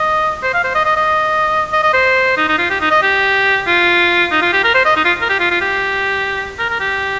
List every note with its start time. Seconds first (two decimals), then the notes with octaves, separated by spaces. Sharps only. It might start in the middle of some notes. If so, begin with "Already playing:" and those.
Already playing: D#5
0.43 C5
0.54 F5
0.64 C5
0.75 D#5
0.85 D#5
0.97 D#5
1.73 D#5
1.83 D#5
1.94 C5
2.38 D#4
2.49 D#4
2.58 F4
2.70 G4
2.81 D#4
2.91 D#5
3.02 G4
3.67 F4
4.32 D#4
4.42 F4
4.53 G4
4.64 A#4
4.75 C5
4.85 D#5
4.96 D#4
5.05 F4
5.21 A#4
5.29 G4
5.40 F4
5.51 F4
5.61 G4
6.59 A#4
6.70 A#4
6.80 G4